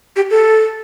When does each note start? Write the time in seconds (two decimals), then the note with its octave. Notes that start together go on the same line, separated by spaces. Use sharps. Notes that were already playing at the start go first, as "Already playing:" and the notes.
0.16 G4
0.30 A4